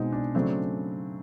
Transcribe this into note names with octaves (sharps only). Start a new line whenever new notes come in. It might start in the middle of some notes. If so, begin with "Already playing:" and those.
Already playing: B2 G#3 C4 D#4
D4
C#3 F#3 A3 C4 D4